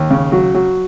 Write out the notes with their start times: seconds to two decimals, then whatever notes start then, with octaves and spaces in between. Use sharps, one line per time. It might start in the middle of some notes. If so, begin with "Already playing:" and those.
Already playing: D#2
0.10 C#3
0.32 F#3
0.54 F#3